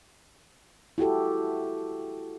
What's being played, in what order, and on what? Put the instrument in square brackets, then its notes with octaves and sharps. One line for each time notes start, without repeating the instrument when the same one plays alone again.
[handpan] E4 F#4 G4 A4